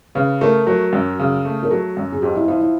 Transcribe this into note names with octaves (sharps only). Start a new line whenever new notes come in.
C#3 B4
A3 A#4
F#3 A#4
F#2
C#3
A3
A#4
F#3 A4
F#2
G#4
F2 G4
E4
F3 E4
E4